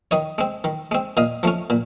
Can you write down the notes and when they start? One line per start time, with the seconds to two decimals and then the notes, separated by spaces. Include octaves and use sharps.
0.11 D#3 C#5 D#5
0.38 G#3 C4
0.64 D#3
0.91 G#3 C4
1.17 A#2 D#5 F5
1.43 F3 A3 C#4
1.70 A#2